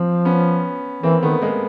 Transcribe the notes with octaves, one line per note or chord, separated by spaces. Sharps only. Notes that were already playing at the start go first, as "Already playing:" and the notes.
Already playing: F3 C4
B3 C#4
E3 A#3 C4
D#3 A3 B3
G#3 A#3